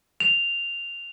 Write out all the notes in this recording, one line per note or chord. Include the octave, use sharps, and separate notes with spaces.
F7